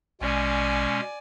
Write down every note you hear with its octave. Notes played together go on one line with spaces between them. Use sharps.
A#1 B2 G#3 C#4 D5 G#5